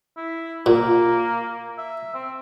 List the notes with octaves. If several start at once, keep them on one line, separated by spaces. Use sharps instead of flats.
E4
A#2 A#3
E5
C4